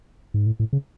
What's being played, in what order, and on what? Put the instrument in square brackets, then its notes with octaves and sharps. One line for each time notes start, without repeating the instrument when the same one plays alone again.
[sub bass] G#2
A2
A2
C#3